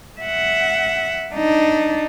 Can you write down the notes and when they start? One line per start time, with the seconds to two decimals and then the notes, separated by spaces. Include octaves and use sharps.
0.21 E5 F#5
1.35 D4 D#4